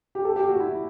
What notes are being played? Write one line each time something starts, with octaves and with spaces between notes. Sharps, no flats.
G4
A4
G4
F#4
E4